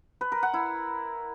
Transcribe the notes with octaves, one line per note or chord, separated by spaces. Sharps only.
B4
A#4
F#5
E4